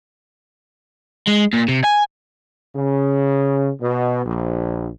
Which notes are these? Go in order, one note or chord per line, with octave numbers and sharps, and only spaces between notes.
G#3
A#2
C3
G#5
C#3
B2
A#1